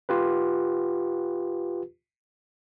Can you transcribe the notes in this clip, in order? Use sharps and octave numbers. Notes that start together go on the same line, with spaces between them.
F4 G4 B4